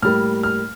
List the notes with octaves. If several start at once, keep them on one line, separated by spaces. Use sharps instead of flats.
A2 G3 A#3 F6
F6